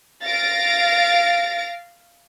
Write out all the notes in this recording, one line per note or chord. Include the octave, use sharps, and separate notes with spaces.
F5 A6 A#6 D7